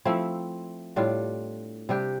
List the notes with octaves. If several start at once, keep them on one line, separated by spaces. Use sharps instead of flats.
F3 A3 C4 E4
A2 G3 D4 F4
C3 G3 D4 G4